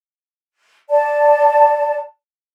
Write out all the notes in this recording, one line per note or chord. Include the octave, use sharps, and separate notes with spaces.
D5 A5